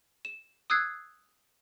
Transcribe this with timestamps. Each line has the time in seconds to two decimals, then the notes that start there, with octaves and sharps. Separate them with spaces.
0.25 E7
0.70 D#6 E6 F#6 G#6 C7